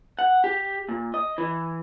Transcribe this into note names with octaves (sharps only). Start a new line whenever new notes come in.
F#5
G4
A#2
D#5
E3